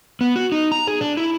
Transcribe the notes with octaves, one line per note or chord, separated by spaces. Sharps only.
B3
F#4
D#4
A#5
G#4
D4
E4